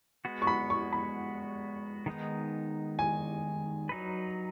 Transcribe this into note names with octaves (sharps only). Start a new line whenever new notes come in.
G#3 B3 F#4
C#6
B5
C#6
B5
D#3 G#3 B3 D#4
G#5
F#3 D#4 B4